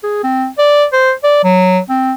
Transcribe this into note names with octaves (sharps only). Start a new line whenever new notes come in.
G#4
C4
D5
C5
D5
F#3
C4